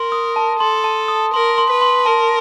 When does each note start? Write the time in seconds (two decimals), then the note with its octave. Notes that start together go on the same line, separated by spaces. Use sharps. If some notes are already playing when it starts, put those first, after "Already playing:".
Already playing: A#4 C6
0.12 D#6
0.36 A5
0.60 A4 C6
0.84 A5
1.08 D#6
1.33 A#4 C6
1.58 C6
1.70 B4
1.82 C6
2.06 A#4 A5